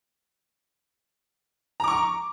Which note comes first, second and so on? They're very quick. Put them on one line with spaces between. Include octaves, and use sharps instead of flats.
A#5 D6 C#6